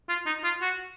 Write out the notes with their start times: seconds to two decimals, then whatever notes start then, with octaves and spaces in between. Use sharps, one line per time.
0.09 F4
0.26 D#4
0.44 F4
0.62 F#4